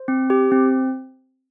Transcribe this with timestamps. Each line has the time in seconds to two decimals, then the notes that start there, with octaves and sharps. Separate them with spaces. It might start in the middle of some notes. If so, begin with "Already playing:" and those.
Already playing: C5
0.08 C4
0.30 G4
0.52 C4